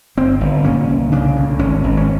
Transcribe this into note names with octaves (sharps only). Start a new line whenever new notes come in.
G1 C4
G1
A#2 C#4
C2
C#3 D4
D2
G#1 C#4
G#1
C#4